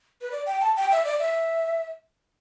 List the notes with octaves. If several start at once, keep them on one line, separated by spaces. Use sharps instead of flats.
B4
D5
G5
A5
G5
E5
D5
E5